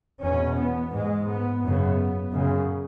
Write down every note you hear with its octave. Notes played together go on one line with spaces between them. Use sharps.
E2 B2 C#4
B3
G#2 G#3
B3
F#2 C#3 B3
F#2 C#3